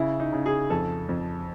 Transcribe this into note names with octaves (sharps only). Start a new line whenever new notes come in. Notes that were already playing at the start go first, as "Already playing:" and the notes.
Already playing: C#3 E4
D#4
C#3
G#4
F2 A4
F2